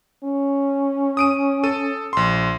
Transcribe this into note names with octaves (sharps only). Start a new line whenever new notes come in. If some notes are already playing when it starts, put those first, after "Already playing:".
C#4
D#6 D7 D#7
A4 D#7
A#1 C6